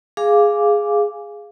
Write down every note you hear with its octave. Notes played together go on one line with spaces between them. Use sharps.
G#4 F5 G#5 D6